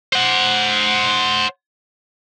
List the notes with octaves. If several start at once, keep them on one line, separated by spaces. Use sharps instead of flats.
C5 F#5